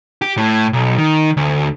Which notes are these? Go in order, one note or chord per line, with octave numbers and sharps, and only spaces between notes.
G4
A2
B1
D#3
D2